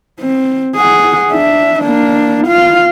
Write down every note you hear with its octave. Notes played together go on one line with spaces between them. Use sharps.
C4
G#4 F#5
D4 E5
A#3 D4
F4 F5